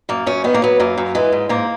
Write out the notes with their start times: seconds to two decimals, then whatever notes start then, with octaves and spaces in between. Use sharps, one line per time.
0.09 F#2 A#3
0.26 F#2 C#4
0.44 D#3 B3
0.54 A#3
0.62 F#3 B3
0.80 F#2 A#3
0.97 F#2
1.15 E3 G#3
1.32 G#2
1.49 G#2 A#3